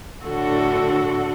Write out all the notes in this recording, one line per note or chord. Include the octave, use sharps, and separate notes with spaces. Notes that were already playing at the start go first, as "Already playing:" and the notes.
A2 D3 F#4 A4